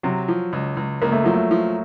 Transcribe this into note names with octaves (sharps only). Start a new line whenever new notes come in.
C3 F#3
F3
C#2
C#2
C#2 A#3
A3
F3 F#3
A3
F3